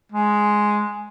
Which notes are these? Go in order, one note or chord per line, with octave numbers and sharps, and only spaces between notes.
G#3